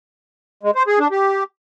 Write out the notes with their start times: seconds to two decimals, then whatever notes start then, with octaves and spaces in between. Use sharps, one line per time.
0.63 G#3
0.75 C5
0.87 G#4
0.99 D4
1.11 G4